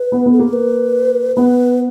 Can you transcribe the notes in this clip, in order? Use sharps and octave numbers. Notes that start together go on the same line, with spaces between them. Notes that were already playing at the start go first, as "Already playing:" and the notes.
Already playing: B4
B3
B3
A4
A#3 A#4
B4
B3 B4